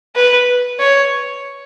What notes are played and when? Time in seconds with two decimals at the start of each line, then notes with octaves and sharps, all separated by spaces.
0.16 B4
0.79 C#5